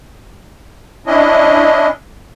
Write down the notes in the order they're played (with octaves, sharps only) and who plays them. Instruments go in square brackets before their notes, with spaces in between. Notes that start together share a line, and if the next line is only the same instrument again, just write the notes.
[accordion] C#4 D4 E4 D#5